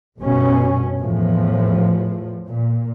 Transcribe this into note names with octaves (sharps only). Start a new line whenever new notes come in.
G1 F#2 B2 C#4
E2 A2 F3
A#2